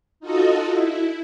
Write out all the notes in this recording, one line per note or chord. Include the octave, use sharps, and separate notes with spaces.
D#4 F4 F#4 A4 D#5
E4